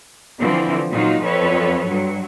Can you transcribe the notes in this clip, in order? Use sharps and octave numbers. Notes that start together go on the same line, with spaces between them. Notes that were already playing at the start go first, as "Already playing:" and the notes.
D3 E3 F3 C4
A#2 F#3 D#4 F4 F#4
F2 F3 A4 B4 C#5
G2 F#3